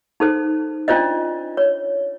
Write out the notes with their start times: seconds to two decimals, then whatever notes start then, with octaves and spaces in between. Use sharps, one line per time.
0.20 D#4 A4 C5
0.88 C#4 D4 F4 C5 D5 D#5
1.57 C#5